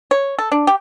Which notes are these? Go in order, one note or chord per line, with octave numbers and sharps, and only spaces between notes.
C#5
A4
D4
G4